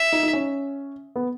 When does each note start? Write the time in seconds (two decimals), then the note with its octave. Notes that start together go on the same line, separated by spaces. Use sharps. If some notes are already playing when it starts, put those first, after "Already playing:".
Already playing: E5
0.13 D#4
0.23 D#4
0.33 C#4
1.16 B3